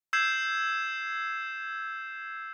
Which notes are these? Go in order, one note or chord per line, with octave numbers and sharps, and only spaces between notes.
E6 G6 G#6 C7 E7